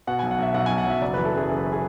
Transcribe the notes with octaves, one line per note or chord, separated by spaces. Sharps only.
B2 F#5
B1 G#5
F#5
B1 E5
B1 F#5
B1 G#5
F#5
F#3 E5
F#1 D5
E3 B4
A4
F#2 G#4
F#1
G#4